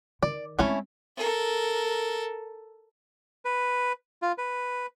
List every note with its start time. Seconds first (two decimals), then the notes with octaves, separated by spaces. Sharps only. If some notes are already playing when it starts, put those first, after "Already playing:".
0.23 D#3 D5
0.59 G#3 A3 C4 C#4 E4
1.17 A4 A#4
3.45 B4
4.22 F4
4.38 B4